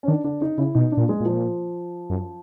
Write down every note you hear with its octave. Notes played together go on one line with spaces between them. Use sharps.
C#4
D#3 D4
D3 D4
C#3 D#4
C#3 E4
B2 D#4
D4
A#2
G#3
A#2
F3
F#2